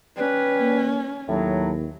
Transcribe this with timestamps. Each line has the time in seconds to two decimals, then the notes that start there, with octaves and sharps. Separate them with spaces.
0.17 G3 C#4 B4
0.60 A#3
1.29 D#2 A2 F#3